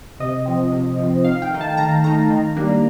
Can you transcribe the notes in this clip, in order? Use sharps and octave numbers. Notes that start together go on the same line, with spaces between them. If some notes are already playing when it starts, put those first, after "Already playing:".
C3 D#5
F3 C4
C3
F3 C4
D#3 F5
G5
A3 D#4
A5
D#3 A#5
A3 D#4 A#5
D#3
G3 A#3 D4